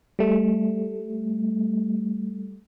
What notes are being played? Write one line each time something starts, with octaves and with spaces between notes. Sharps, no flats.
G3 A3